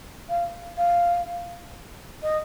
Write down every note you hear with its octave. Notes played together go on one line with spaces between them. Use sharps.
F5
F5
D#5